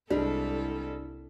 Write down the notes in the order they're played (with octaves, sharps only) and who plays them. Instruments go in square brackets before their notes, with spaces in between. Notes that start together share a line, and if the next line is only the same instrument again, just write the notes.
[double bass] C2 [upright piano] G3 G#3 [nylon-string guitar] D4 [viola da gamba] E4 A4